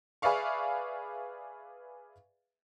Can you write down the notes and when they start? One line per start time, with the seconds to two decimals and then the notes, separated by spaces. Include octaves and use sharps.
0.22 G#4 B4 D5 E5 F5 C#6